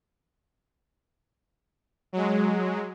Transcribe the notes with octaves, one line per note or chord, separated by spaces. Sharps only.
F#3 G#3